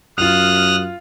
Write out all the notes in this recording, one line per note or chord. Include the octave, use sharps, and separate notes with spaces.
F#2 F4 D#6 F6 F#6 F7